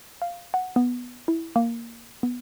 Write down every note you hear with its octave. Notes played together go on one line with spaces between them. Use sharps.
F5
F#5
B3
E4
A#3
B3